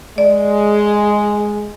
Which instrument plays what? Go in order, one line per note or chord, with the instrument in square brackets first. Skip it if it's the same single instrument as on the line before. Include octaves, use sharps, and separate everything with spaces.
[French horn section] G#3 [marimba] D5